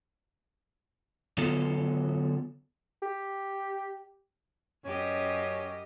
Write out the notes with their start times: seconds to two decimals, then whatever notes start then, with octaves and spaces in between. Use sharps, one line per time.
1.38 D3 F#3 B3 F4 A4
3.02 G4
4.85 F#2 C#4 G4 D#5